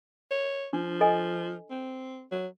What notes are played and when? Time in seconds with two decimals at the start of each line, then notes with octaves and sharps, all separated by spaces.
0.31 C#5
0.73 F3 D4
1.01 A4 D#5 G#5
1.70 C4
2.32 F#3